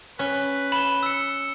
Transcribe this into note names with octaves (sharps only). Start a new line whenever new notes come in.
C#4 B4
B5 E7 G7
E6 C#7